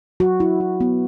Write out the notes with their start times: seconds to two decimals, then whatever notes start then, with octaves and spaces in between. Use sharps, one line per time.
0.20 F#3 F#4
0.40 E4
0.60 E4
0.81 B3